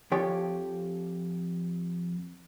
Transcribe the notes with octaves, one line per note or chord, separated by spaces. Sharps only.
F2 F3 G4 C#5